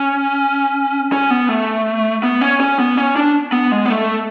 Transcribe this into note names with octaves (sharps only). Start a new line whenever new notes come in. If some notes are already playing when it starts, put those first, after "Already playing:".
Already playing: C#4
C#4
B3
A3
B3
C#4
C#4
B3
C#4
D4
B3
G#3
B3
A3